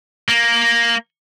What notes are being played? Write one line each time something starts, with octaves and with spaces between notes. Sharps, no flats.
A#3